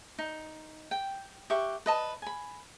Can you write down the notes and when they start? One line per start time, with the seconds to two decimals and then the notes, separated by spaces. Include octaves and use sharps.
0.19 D#4
0.91 G5
1.50 G4 E5 F#5 C#6
1.86 B4 D#5 A5
2.22 G#5 B5